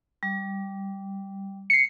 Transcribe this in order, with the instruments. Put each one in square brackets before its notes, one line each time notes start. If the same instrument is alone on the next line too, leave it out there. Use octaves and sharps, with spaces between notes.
[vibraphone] G3
[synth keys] C7 C#7